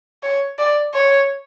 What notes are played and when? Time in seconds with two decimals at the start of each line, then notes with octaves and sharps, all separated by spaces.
0.23 C#5
0.58 D5
0.94 C#5